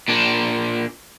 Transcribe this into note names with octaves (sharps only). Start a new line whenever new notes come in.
A#2 D4